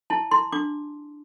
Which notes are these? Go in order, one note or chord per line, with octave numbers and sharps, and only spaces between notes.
E4 A5
E4 C6
D4 D6